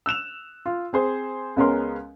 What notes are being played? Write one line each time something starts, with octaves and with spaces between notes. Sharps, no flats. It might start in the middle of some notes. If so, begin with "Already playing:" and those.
E6 F#6 E7 F7
F4
C4 G#4 C5
C#2 G#3 B3 C#4 A#4 C6